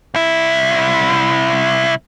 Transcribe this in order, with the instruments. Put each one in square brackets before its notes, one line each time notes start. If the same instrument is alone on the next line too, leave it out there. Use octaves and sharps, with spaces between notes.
[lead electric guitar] C2 E4